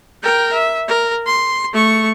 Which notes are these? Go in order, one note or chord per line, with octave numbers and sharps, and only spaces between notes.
A#4 G5
E5
A#4
C6
A3 C#6